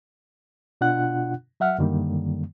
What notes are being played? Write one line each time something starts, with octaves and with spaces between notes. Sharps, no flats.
B2 D4 F4 F#5 F#6
F#3 E5 F#5 F6
F#2 D3 D#3 G3 A#3